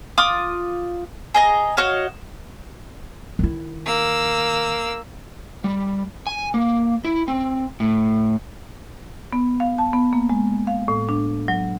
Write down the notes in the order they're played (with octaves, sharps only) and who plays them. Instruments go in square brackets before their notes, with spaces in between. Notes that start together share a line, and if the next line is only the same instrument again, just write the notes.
[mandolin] F4 D6 D#6
G#4 D#5 A#5
F#4 C#5 D#5 F5
[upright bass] D#3 E4
[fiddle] A#3 E6
[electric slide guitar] G3
G#5
A#3
E4
C4
A2
[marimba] B3
F5
A5
B3
A#3
G#3
F5
A2
D4
F#3